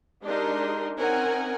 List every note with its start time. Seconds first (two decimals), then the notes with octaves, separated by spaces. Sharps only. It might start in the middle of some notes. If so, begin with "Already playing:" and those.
0.24 G#3 D4 D#4 G4 A#4 C6
0.96 C4 C#4 D#4 A#4 F#5 G#5